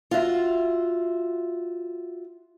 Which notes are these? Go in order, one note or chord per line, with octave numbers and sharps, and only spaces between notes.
F4 F#4 E5